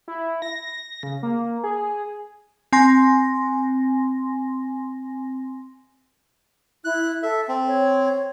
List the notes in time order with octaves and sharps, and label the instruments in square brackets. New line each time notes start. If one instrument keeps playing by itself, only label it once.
[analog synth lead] E4
A#6
C#3
A#3
G#4
[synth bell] C4 G#5 C6 A#6
[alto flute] E4 [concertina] F#6
[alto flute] A4 [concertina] E5
[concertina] C4
[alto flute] C#5